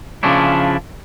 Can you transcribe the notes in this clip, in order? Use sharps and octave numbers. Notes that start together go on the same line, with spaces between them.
C#3 F3 C#4 D4 E4